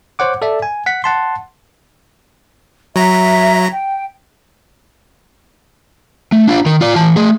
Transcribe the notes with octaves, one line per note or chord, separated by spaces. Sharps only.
C5 C#5 F#5 D6
A4 D5 E5
G#5
F#5 B6
F#5 A5 C6
F#3 E5 A#5
G5
A3
D4 F4
D#3 A#4
F4 D5
E3 A5
A3 G#4